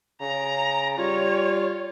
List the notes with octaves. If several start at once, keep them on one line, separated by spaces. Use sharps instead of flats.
C#3 A#5
G3 F4 C#5